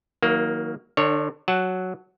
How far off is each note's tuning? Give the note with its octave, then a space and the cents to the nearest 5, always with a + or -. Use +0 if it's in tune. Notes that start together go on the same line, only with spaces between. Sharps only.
D#3 +35 F#3 +0 A#3 +0
D3 +35 D4 +0 C#5 +0
F#3 +0 F#5 +0 A5 +5